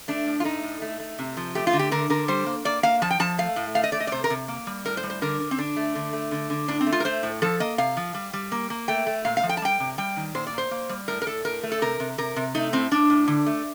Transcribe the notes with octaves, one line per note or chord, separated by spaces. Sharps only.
A3 D4
A2
F4
A3 D#4
A2
A3
A3
C3
F3
A3 G4
F4
D3
G4
D3 A#4
D3 A#4
G3 C5
A#3
A#3 D5
A#3 F5
F3 A5
G5
F3 A5
A3 F5
A2
A3 F5
D#5
A3 D5
D#5
D5
C3 C5
A#4
C3
A#3
G3
A2 A#4
C5
G3
C5
D3 A#4
D3
C4
D3 D4
A3
D3
A3
D3
D3
A2 D4
C4
A3
F4
A#4
A3 C5
A2
F3 A4
A#3 D#5
C3 F5
F3
G3
G3
A#3
A#3
A3 G5
A3
A#2 F5
F5
F3
G5
A5
G3 G5
C3
G3 G5
D#3
A#2 C5
D5
A#3 C5
A#3
G3
A2 A#4
A#4
A2 A4
A2 A#4
A3
A4
C3 A#4
C3
C3 A#4
C3
A3 D#4
A2 C4
A2 D4
A2
D3
A3